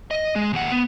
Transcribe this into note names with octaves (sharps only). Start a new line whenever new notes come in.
D#5
G#3
D#2 F#5
B3